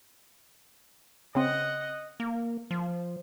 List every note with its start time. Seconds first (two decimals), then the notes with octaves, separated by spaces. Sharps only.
1.35 C#3 C4 D#5 F#5
2.20 A#3
2.71 F3